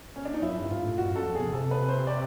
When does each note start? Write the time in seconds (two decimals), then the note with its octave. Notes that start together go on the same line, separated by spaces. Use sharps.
0.16 C#4
0.25 D4
0.34 D#4
0.42 F#2 E4
0.57 G2
0.70 G#2 F4
0.84 A2
0.98 G2 F#4
1.11 F#2 A4
1.26 F2
1.35 B2 G#4
1.47 C#3
1.53 C3 A4
1.71 B4
1.89 C5
2.07 D5